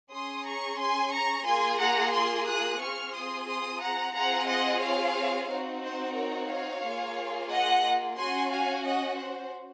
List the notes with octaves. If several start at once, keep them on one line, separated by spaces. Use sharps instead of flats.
C#4 G#4 C6 D#6
A#5 C#6
G#5 C6
A#5 C#6
A#3 F4 G#4 G#5 C6
F#5 A#5
G#5 C6
D#6 F#6
C4 F4 G#4 C#6 F6
C6 D#6
C6 D#6
F#5 A#5
C4 F4 G#4 F#5 A#5
D#5 F#5
C#5 F5
C4 D#4 F#4
C5
A#4 C#5
C#5 F5
A#3 F4 G#4
D#5 F#5
C#4 F#4 G#5 C6
F5 G#5
D#5 F#5
C5